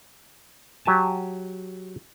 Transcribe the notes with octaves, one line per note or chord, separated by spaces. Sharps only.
F#3 G4 G#5 A5